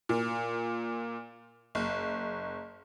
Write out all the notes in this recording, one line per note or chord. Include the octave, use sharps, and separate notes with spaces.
A#2
F#1